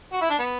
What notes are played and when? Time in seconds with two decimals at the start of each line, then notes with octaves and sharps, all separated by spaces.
0.13 F#4
0.21 E4
0.30 D4
0.39 B3